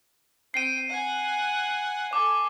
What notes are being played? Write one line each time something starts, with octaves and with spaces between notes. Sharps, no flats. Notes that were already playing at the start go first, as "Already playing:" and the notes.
C4 G5 C7 D#7
F#5 G#5
A4 G#5 D6